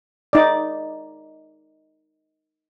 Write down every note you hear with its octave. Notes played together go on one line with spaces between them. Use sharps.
D#4 D5